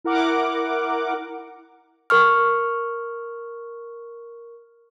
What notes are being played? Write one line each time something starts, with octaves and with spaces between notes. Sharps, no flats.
E4 A#4 F#5 D6
A#4 C#6 F6